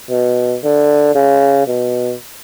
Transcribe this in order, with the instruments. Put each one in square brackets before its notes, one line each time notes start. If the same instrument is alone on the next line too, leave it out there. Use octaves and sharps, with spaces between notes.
[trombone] B2
D3
C#3
B2